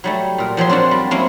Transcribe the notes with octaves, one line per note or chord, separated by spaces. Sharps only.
F#3 G3 A3
A#2 A#4
F3 F#3 G4 C6
C4 D4 F4 F#4
G3
F#3 A#3 C4 C#4 E4